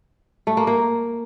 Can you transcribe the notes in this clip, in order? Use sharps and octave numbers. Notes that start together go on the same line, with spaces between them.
A3
A#3
A#3